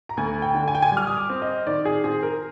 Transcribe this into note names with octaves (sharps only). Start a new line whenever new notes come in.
A#5
D2 G#5
G5
D3
G#5
G5
G#5
G3 F6
D#6
D6
C4
D#5
D#3 D5
G#4
C4 G#4
A#4